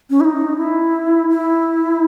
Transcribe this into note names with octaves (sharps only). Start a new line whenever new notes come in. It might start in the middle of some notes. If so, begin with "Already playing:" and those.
C#4
E4
D#4
E4
E4